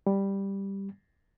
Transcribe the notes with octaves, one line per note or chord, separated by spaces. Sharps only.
G3